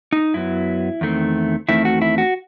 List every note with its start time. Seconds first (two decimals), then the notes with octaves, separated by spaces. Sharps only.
0.13 D#4
0.34 F#2 F#3 B3 E4
1.01 E2 D#3 A3 C4
1.69 E2 D#3 A3 C4 E4
1.85 F#4
2.02 E4
2.18 F#4